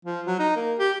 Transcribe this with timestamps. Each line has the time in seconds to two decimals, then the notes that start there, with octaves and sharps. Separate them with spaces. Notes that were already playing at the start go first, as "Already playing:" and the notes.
0.05 F3
0.26 F#3
0.39 D#4
0.56 A#3
0.79 G4